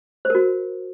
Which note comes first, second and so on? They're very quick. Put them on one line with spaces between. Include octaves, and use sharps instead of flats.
C5 A#4 F#4